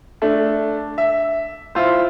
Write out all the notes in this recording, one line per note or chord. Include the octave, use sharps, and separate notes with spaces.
A3 D4
E5
E4 F4 C5